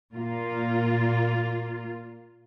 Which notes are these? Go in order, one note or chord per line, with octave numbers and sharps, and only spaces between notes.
A#2 A#3 F4